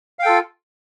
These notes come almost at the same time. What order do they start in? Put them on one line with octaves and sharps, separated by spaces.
F5 G5 A4 F4